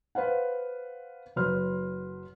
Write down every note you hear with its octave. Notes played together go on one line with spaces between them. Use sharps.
B4 C5 F5 F#5
F#1 F#3 B4 C6 F6